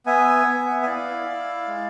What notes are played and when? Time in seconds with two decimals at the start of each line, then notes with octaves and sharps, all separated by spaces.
0.06 B3 E5 G#5
0.47 B3
0.83 G#5
0.86 E4 D5 F5
1.27 E4
1.67 G#3